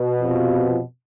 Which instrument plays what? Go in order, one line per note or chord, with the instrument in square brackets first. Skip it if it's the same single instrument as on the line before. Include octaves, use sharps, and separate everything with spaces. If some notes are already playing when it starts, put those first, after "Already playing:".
Already playing: [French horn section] B2
[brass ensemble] F2 C3 F3 B3 F4